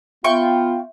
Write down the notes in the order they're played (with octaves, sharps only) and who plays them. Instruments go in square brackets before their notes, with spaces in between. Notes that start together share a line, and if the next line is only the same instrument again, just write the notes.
[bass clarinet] B3 [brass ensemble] F4 [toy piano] E5 [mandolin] G5 C#6